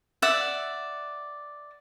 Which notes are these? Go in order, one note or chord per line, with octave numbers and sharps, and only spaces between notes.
D5 E5 F#5